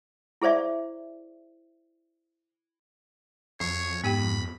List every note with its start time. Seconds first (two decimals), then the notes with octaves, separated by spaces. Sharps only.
0.42 E4 G#4 C5 D5 E5
3.60 F2 C#5 C#6 C7
4.04 G#2 B3 G4 G5 B5